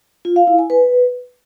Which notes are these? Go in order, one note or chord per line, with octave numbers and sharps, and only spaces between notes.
F4
F5
E4
G#5
B4